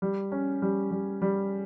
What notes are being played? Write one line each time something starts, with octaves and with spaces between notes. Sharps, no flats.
G3
C#4
G3
G3
G3